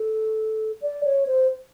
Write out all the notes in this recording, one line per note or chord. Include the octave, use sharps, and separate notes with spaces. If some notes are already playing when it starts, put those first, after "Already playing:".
Already playing: A4
D5
C#5
C5